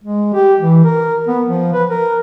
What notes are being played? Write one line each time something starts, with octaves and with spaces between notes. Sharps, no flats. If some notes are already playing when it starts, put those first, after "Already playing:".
G#3
G4
E3
A#4
B3
F3
B4
A#4